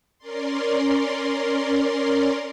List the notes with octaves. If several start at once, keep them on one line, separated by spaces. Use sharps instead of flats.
C#4 A#4 D5 C6